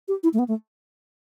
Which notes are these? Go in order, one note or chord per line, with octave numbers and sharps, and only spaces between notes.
G4
E4
A3
B3
A3